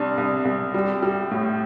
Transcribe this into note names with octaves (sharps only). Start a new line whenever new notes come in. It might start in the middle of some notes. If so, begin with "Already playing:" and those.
Already playing: C2 D4
C2
C2
G3
G3
A2